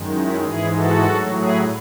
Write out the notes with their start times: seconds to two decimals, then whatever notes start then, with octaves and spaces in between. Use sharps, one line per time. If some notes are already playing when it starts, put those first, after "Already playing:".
Already playing: F#2 D#3 G#3
0.15 C#4 E4
0.45 G#2 E3 G#3 E4 G#4
0.75 F#4 A4
1.06 A2 F#3
1.36 E4 G#4